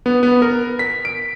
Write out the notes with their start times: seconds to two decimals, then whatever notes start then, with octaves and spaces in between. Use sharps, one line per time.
0.06 B3
0.23 B3
0.42 A#4
0.79 B6
1.05 D7